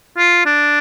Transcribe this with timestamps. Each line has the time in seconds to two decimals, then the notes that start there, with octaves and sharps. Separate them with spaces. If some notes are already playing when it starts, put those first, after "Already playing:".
0.18 F4
0.46 D4